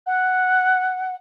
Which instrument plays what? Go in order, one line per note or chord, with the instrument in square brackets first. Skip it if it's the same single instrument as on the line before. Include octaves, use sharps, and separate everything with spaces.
[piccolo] F#5